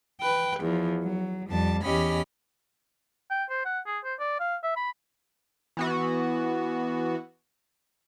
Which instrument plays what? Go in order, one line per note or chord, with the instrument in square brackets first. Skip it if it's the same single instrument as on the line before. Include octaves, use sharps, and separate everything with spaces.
[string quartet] B4 G5
E2 F3
F#3
F2 G3 A5
E2 C#4 G4 D#5 B5 F6
[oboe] G5
C5
F#5
G#4
C5
D5
F5
E5
B5
[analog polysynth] E3 B3 F#4